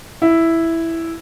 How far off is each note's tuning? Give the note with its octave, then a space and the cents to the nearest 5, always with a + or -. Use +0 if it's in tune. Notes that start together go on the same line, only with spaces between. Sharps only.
E4 +0